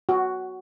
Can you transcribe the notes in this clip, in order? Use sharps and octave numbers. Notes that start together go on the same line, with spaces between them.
F#4